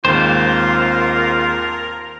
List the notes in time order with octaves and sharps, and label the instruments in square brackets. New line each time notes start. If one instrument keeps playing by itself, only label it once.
[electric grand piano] D#2 G#2 C4 [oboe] F4 [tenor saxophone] A#4 [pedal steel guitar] C5